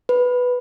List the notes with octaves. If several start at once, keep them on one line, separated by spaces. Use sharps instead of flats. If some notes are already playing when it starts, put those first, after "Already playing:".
B4